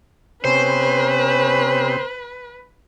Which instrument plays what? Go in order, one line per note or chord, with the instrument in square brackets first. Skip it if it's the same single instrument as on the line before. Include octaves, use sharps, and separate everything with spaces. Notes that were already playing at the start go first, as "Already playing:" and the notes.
[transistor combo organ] C3 B3 G4 [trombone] C#4 [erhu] B4 [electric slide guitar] C5